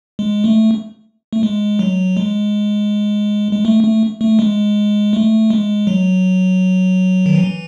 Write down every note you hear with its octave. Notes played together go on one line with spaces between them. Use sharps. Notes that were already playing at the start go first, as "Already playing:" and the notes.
G#3
A3
A3
G#3
F#3
G#3
G#3
A3
A3
A3
G#3
A3
G#3
F#3
D#3
E3